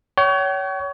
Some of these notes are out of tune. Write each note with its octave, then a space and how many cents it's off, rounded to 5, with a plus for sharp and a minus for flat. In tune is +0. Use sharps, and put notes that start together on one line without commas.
C#5 +25 G5 -45